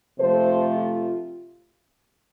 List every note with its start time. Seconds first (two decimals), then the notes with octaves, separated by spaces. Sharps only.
0.18 C3 F3 A3 A4 C5
0.76 F4